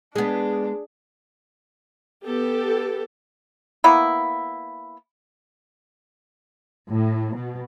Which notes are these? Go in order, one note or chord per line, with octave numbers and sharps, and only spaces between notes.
G#3 B3 D4 G#4
B3 G4 A4
A#3 B3 E4
A2
B2